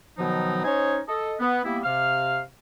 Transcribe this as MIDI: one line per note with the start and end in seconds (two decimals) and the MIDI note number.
0.18 0.61 47
0.18 0.61 51
0.18 0.61 53
0.18 0.61 54
0.18 0.61 63
0.65 0.99 61
0.65 0.99 63
0.65 0.99 72
0.65 0.99 73
0.65 0.99 75
0.65 0.99 80
1.08 1.34 69
1.08 1.34 75
1.40 1.63 59
1.65 1.79 55
1.65 1.79 58
1.65 1.79 59
1.65 1.79 64
1.84 2.40 48
1.84 2.40 77
1.84 2.40 89